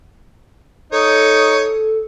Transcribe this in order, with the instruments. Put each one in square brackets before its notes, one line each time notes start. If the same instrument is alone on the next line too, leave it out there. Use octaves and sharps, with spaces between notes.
[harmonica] D#4 C#5 [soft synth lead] A4